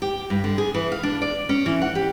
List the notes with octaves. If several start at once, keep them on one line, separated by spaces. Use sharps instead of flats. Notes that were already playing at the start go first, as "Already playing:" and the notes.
G4
G2
D3
G#4
E3
F5
D4
D5
C#4
E3
F#5
G4